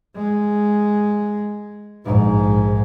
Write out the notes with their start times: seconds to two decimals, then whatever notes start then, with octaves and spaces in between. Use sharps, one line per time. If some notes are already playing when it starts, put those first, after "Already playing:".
0.15 G#3
2.05 A#1 G#2